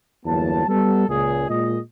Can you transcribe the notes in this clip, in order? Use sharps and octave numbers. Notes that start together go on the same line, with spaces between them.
G1 E2 F#3 A#3 A5
G3 B3 A4
C#2 A#2 G#4
A#2 G#3 D#5